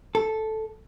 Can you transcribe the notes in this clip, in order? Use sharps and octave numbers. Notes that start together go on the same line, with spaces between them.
A4